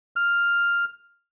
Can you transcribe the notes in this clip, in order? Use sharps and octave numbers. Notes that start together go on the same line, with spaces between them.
F6